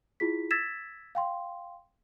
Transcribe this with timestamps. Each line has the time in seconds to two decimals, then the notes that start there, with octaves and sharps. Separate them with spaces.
0.20 E4 F4 G#4 B6
0.51 E6 G#6 A6 B6 E7
1.15 F5 G5 C6